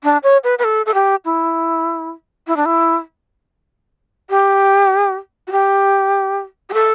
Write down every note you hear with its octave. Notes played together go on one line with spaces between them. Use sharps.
D4
C#5
B4
B4
A4
A4
G4
E4
E4
D4
E4
G4
F#4
G4
G4
A4